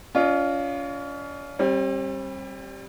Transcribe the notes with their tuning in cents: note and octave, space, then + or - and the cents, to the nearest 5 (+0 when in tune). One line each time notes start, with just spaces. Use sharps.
C#4 +35 F4 +0 D#5 -45
G3 +0 C4 +40